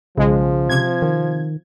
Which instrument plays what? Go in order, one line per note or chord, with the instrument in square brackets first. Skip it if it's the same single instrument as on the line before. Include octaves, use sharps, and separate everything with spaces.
[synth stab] B1 G#3 [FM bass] C#3 [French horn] F3
[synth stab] C3 G#6
[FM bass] D#3